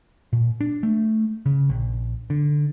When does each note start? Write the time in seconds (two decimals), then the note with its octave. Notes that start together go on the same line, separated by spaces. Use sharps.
0.33 A#2
0.61 D4
0.83 A3
1.46 C#3
1.69 A#1
2.30 D3